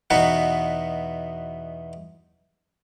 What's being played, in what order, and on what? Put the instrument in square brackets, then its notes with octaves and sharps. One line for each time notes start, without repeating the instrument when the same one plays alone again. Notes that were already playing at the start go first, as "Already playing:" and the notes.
[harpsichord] E2 B2 B3 D#4 F#4